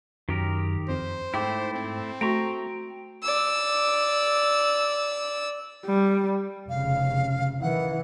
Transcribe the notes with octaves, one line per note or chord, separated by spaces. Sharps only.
F#2 D#3 G4 A#4
F2 C5
G#2 A3 E4 G5 C6 D6
C4
A3 F#4 G5 A#5 C6 C#6 A#6
D5 E6
G3
F1 C#3 F5
D#3 E3 F#5